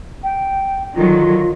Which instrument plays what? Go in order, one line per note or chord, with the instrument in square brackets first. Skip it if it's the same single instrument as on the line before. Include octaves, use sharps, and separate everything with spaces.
[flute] G5
[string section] D3 D#3 F#3 [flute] F4